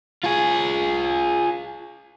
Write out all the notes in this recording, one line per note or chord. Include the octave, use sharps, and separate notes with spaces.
F4 G#4